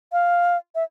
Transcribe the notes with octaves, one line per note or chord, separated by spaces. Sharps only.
F5
E5